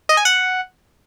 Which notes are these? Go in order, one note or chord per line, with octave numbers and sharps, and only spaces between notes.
D#5
G#5
F#5